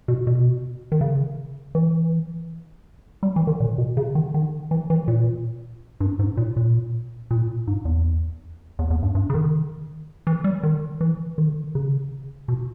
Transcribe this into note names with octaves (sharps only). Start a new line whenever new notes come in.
B2
B2
D#3
C#3
E3
G3
E3
D#3
A#2
B2
C#3
D#3
D#3
E3
E3
A#2
G2
G#2
A#2
A#2
A#2
G#2
E2
E2
E2
G2
G2
C#3
D#3
E3
G3
D#3
E3
D#3
C#3
B2